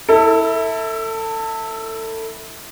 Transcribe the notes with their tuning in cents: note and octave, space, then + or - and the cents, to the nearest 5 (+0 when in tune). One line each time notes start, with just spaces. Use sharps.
E4 -15 A4 +25